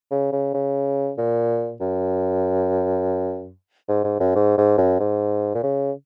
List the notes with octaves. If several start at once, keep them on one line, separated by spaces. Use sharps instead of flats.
C#3
C#3
C#3
A#2
F#2
G#2
G#2
F#2
G#2
G#2
F#2
G#2
A#2
C#3